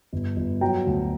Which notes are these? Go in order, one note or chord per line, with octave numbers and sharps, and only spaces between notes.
G1
G1
F#3 G5 A#5
D2